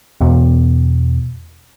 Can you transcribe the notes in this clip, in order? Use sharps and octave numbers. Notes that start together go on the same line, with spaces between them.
E2 B2